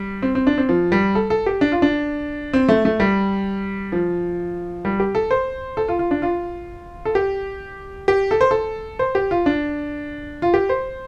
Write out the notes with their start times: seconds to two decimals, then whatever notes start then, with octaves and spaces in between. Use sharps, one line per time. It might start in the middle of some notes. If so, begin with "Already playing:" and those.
Already playing: G3
0.22 C4
0.35 C4
0.47 D4
0.58 C4
0.69 F3
0.92 G3
1.15 A4
1.30 A4
1.46 G4
1.61 D4
1.72 F4
1.82 D4
2.53 C4
2.69 A3
2.85 A3
3.00 G3
3.92 F3
4.85 G3
5.00 G4
5.15 A4
5.31 C5
5.77 A4
5.89 F4
5.99 F4
6.11 D4
6.22 F4
7.05 A4
7.15 G4
8.08 G4
8.31 A4
8.41 C5
8.51 A4
8.99 C5
9.15 G4
9.31 F4
9.46 D4
10.42 F4
10.54 G4
10.69 C5